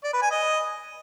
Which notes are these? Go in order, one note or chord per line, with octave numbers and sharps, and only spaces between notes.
D5
B4
G#5
D#5